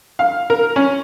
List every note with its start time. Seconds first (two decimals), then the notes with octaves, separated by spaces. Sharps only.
0.19 F5
0.50 A#4
0.76 C#4